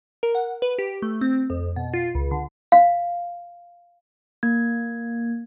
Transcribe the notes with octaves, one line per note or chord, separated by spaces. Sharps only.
A#4
F#5
B4
G4
A3
C4
F2
B2
F4
C#2
D3
F5
A#3 G#6